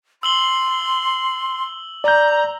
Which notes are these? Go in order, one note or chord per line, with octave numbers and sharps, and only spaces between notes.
C6 E6 F#7 G7
D5 A#5 G6